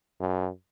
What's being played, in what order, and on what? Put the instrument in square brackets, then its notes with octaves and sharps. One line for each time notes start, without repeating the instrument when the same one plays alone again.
[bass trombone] F#2